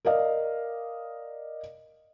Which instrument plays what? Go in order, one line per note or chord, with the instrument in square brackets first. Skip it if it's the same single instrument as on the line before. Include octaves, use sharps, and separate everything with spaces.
[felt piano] A#4 D5 D#5 F5